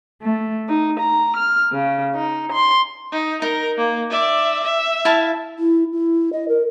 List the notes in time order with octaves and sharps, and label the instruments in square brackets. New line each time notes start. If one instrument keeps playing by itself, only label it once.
[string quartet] A3
D#4
A#5
F6
C#3
D#4
C6
[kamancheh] D#4
[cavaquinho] D#4 [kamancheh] A#4
[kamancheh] A#3
D5 E5
E5
[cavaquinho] E4 F5 A5
[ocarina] E4
E4
D#5
A#4